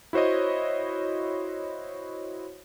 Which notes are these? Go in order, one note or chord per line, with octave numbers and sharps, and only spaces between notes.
E4 F#4 C5 C#5 D#5